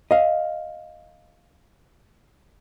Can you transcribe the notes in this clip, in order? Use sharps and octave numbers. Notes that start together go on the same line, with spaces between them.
D#5 F5